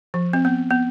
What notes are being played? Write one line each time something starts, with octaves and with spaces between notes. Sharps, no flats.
F3
C4
B3
B3